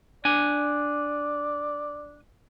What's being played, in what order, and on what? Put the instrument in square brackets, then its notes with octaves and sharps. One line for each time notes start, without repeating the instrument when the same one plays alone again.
[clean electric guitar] D4 G#5 [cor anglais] D5